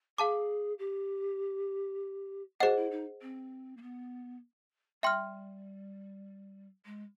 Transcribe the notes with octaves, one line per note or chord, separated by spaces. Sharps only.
G#4 F5 A5 D6
G4
F#4 G#4 C5 D#5 F#5
E4
D#4
C4
A#3
B3
G3 E5 G5 C6 F6
G#3